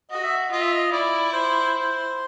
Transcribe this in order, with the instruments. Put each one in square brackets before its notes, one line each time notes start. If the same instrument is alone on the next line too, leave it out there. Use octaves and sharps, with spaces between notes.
[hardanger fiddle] F#4 [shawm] D#5
[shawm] E5
[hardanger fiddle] F4 [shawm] D#5
[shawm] E5
D#5
[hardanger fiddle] E4 [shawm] D5
[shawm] C5
C5